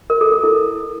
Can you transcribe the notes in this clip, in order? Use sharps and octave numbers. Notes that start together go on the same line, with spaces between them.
A#4
A4
A4
E4